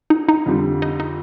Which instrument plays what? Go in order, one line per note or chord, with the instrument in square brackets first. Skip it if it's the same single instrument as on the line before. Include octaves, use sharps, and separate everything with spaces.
[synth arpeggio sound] D#4
D#4
[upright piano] F2 D3 G3
[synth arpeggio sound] D#4
D#4